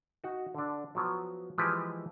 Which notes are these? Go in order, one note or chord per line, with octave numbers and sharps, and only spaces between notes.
D#4 F#4
D3 D4
F3 F#3 B3
E3 F3 G#3 G4 B4